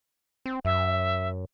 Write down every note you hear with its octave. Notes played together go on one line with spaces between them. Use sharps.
C4
F#2 E5